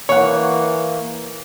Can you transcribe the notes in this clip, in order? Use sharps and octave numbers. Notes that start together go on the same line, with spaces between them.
E3 A#3 C#5 F#5